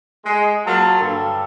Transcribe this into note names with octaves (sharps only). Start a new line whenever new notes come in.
G#3
F#3 A#3 F4 A5
G2 D3 A4